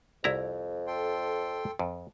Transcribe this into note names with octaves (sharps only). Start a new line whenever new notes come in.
C2 F2 E4 A#5
A4 G5 C6
F2